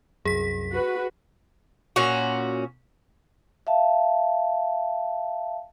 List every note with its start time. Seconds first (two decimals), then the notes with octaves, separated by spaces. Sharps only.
0.25 C2 F#2 G#4 B6
0.73 F#4 B4
1.96 A#2 C#4 F#4
3.67 E5 F5 A5